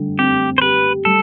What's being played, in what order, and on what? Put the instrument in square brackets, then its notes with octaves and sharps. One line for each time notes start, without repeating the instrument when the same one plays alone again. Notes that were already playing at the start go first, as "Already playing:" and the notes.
Already playing: [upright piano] D3 G3
[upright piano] C4 [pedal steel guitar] G4
[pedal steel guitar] C5
[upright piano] G4 [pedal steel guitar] B4
[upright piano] G3 [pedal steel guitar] A4